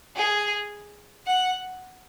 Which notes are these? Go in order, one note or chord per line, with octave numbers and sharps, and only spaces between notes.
G#4
F#5